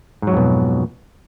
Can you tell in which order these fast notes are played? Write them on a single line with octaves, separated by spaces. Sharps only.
G#2 F#3 F2 B2